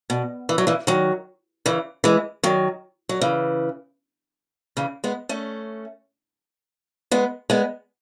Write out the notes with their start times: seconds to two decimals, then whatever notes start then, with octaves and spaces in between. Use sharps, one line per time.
0.10 B2
0.49 E3
0.58 F#3
0.67 C#3 E3
0.87 D#3 F#3
1.66 C#3 E3
2.04 E3 G#3
2.43 D#3 F#3
3.09 F#3
3.21 C#3 E3
4.77 C#3 E3
5.04 G#3 B3
5.29 A3 C#4
7.11 G#3 B3
7.50 G#3 B3